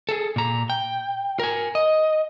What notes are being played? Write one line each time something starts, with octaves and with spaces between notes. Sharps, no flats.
G#4 A4
A#2 A#5
G5
A#4 G#5
D#5